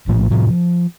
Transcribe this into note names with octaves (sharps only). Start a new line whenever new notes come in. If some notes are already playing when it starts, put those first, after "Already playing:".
A#1 A2 F3
A2 C3 F3
F3